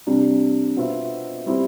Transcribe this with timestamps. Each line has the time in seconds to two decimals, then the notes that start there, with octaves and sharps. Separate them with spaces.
0.07 C3 G3 D4
0.77 B2 B3 F4 C5 E5
1.46 G3 C4 E4 G4 C5